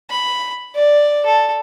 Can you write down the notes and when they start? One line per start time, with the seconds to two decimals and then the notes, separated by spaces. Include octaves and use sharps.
0.10 B5
0.75 D5
1.26 A4